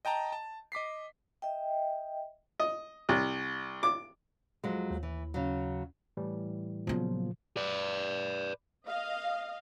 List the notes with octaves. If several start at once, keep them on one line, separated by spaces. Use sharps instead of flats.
D#5 G5 A5 A#5
A5
D#5 D6 B6 C7
D#5 E5 G5
D#5
C2
D6
F2 F#3 G#3
D#2
E3
C#3 F#3
A2 E3 G3
A#2 C#3 F3 F#3 B3
B4 D5
D#5 F5